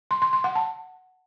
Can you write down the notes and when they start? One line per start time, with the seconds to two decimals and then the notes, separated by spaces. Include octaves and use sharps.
0.11 C6
0.22 C6
0.33 C6
0.44 F#5
0.55 A5